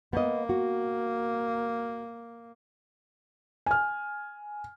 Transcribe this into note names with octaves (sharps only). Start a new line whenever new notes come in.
A#3 B3 D#5
F#4
G#5 F6